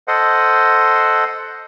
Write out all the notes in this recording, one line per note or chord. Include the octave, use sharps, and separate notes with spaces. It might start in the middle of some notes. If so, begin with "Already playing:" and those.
A4 C5 D#5 F#5